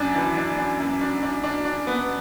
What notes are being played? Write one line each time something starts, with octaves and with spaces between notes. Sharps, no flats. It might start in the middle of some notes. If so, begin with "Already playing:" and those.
Already playing: F#2 D4
E3
D4
D4
F#2
D4
D4
D4
D4
B3